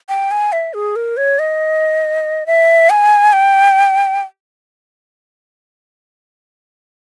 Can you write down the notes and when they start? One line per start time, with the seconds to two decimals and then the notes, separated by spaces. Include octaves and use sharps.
0.09 G5
0.31 G#5
0.52 E5
0.74 G#4
0.96 A#4
1.17 C#5
1.39 D#5
2.47 E5
2.90 G#5
3.33 G5